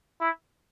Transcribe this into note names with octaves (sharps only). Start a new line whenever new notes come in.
E4